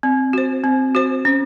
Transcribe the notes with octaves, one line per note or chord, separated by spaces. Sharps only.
C4
F#4 C5
C4
F#4 C5
C#4